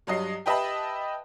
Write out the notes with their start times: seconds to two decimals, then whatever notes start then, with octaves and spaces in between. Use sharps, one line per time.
0.07 G2 F#3 D#5 C7
0.46 G4 B4 D#5 E5 A5 B5